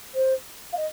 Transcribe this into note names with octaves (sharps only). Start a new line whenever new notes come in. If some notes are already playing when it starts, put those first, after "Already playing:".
C5
F5
D#5